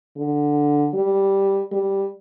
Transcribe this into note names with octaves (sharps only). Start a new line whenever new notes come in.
D3
G3
G3